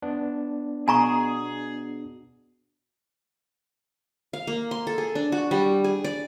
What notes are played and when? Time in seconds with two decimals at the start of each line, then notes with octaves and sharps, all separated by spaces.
0.02 B3 D4
0.88 B2 G#4 G#5 A#5 C#6
4.33 F5
4.47 A#3
4.71 C6
4.87 A4
4.98 G#4
5.15 D4
5.32 F#4
5.51 G3
5.84 G#4
6.04 D5